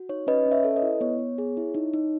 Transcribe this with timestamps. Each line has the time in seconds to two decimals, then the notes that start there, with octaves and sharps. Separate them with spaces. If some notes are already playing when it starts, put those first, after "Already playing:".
Already playing: F#4
0.09 D#4 C#5
0.27 C#4 B4 D#5
0.46 C#4
0.51 C#5 E5
0.64 A4
0.76 B4 D#5
0.82 E4
1.01 B3 C#5
1.19 B3
1.38 G#4
1.57 E4
1.74 D#4
1.94 D#4